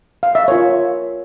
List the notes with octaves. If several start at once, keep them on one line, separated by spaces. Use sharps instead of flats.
F5
E5
F4 A#4 C#5